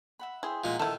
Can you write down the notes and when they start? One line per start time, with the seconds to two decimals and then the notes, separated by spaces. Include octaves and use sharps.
0.19 E5 F#5 B5
0.43 E4 G#4 C5 G5
0.64 A#2 G#3 D#4 F#5
0.80 D#3 E4 A4